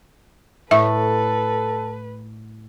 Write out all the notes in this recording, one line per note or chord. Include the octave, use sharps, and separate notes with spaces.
A2 A4 B4 E5